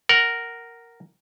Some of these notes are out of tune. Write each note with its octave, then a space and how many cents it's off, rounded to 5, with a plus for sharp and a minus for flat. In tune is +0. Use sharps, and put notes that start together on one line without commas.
A#4 +0 F#5 +20